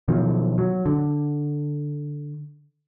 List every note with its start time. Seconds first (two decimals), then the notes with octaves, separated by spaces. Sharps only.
0.08 B2 D#3 F3 F#3
0.58 F#3
0.86 D3